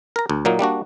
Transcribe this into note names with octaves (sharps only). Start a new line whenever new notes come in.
A#4 A#5
D2
A#2 F#3 A#3 D#4
G3 A#3 D4 F#4